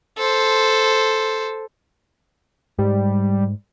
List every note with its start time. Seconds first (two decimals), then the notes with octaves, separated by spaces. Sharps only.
0.18 A4 C5
2.79 G#2 G3